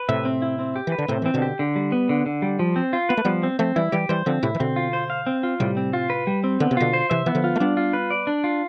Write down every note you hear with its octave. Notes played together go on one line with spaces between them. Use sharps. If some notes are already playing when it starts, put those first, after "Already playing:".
Already playing: B4
A2 C3 E5
C4
E4
C4
G4
E3 B4
D3
A2 C3 C4
E3 C4
B2 D3
G4
D3
G3
B3
D3
D3
G3
F3
C4
F4
B3 B4
A3
F3 G3 B3
C4
F3 A3 C4
E3 G3 E4
E3 G3 G4
E3 G3 C5
D3 F3 C4
A2 C3 E4
E3
B2 D3 C4
F4
C5
F5
C4
F4
A2 C3 G3
C4
F4
B4
G3
C4
D3 B3
C3
B2 D3 F4
C5
C3 E3 E5
E3 B3
D3 F3
F4
A3
G3 B3 D4
F4
B4
D5
D4
F4